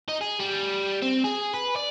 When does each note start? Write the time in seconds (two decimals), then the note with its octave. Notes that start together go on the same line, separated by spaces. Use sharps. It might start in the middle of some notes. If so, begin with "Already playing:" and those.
0.08 D#4
0.21 G#4
0.40 G3
1.02 C4
1.24 G#4
1.54 B4
1.76 D5